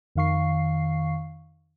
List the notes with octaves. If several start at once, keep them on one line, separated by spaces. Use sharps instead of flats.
F2 D#3 F5 C#6 C7